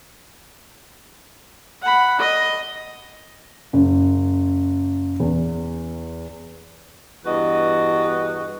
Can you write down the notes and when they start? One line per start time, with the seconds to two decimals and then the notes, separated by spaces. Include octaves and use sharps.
1.82 F#5 B5
2.19 D#5
3.73 F#1
5.20 E2
7.25 E2 G2 F#4 B4 D#5